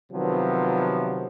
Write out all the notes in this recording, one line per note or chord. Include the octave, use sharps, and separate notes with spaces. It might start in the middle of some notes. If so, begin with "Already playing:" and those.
C3 D#3 F3 F#3 B3